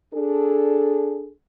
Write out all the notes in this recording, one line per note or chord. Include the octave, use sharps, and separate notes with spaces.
D4 G#4 A4